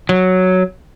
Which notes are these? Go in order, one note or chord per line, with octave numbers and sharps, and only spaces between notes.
F#3